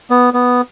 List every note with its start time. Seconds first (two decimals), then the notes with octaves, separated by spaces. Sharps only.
0.10 B3
0.34 B3